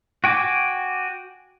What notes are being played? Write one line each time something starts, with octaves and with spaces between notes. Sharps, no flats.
F#4 G5 G#5 D6